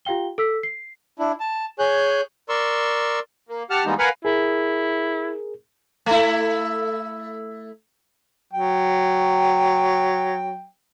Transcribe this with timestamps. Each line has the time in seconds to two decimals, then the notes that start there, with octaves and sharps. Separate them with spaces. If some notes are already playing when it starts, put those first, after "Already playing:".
0.05 F4 G4 F5 G5 G7
0.38 A4 E6 B6
0.63 C7
1.19 D4 E4
1.40 A5
1.79 G#4 C#5 G#5 F#6 G6
2.49 A#4 D5 C6 C#6 E6
3.49 A#3
3.70 G4 F#5 A5 F6
3.86 E3 G3 G#3 A#3 B3 D#4
3.99 A#4 B4 F5 F#5 G#5 B5
4.25 E4 G#4 A#4
6.06 A3 E4
8.53 F#3 G5